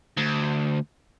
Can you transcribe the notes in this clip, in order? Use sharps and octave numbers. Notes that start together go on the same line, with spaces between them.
D2